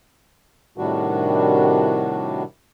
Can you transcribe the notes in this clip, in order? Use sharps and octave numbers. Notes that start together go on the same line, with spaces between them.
A2 C3 D#3 G3 D4 F#4